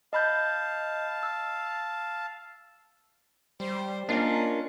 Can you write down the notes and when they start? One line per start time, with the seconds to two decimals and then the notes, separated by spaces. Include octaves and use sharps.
0.13 D#5 F5 A5 B5 G6
1.23 E6
3.60 G3 C5
4.09 A#3 C#4 D4 F4 A#4 D#5